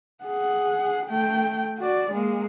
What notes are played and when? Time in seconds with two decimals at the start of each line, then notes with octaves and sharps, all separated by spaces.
0.24 G#4 F#5
1.07 A3 G5
1.78 F#4 D5
2.11 G#3 A#3